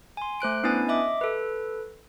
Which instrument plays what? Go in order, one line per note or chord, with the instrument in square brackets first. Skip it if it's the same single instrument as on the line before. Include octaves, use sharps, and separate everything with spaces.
[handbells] G#5 C6
A3 C5 F#6 D7
B3 C#4 D4 E4 B4 G#5
D#5 E5 D6
A4 B4